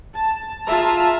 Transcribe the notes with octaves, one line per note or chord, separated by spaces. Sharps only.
A5
F4 G#4 E5 A5 A#5